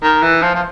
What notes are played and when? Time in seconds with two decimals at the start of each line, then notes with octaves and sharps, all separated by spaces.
0.03 D#3
0.22 E3
0.42 F3
0.55 F3